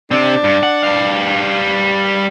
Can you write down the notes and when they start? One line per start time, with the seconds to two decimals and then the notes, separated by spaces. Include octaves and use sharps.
0.11 C3 C4 D4
0.44 G2
0.63 F#5
0.84 G3 F5